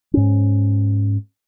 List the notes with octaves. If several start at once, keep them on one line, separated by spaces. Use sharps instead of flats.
G#2 C#4